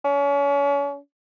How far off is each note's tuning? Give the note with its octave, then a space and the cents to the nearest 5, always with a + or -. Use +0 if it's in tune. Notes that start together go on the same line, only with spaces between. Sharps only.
C#4 +35